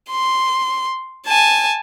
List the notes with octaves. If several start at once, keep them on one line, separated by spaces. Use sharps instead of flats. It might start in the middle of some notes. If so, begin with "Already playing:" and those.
C6
G#5 A5